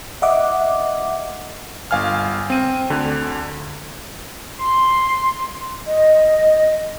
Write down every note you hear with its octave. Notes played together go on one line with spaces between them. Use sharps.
D#5 E5 F#5 D6
G1 F5 G#5 F6
C4 D#7
D2 D3
C6
D#5